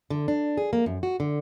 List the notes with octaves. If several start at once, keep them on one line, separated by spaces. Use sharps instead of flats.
D3
D4
G#4
A#3
F#2
F#4
D3